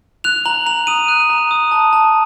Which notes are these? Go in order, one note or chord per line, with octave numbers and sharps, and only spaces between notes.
F#6 F7
A#5 F#7
A#5 F7
D#6 D#7
F#6
A#5
D#6
A5
A5